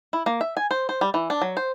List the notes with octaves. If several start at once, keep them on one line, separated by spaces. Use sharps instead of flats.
E4
A#3
E5
G#5
C5
C5
G3
E3
D4
F#3
C5